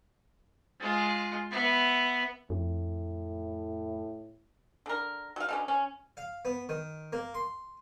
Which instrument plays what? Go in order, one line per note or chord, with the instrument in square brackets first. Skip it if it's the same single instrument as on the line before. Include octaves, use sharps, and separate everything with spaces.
[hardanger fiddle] G#3 F4
B3 E5
[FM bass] F2 [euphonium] A2
[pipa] D3 A#4
F#3 F5
B2 D3 C#4
C#4
[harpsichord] F5
B3
D#3
A#3
C6